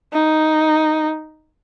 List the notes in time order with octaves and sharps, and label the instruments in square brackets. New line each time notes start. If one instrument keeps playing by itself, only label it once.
[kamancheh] D#4